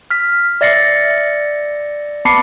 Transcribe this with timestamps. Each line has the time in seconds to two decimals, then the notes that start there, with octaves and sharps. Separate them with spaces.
0.11 F6 B6
0.61 D5 E5 A6 A#6 C7 C#7
2.25 B3 A5 B5 D6 C7 C#7